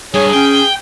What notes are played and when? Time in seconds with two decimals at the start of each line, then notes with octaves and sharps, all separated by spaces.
0.14 G2 G#4 C#5
0.33 C#4 G5